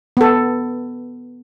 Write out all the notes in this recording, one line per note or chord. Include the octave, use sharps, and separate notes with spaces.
B3 A4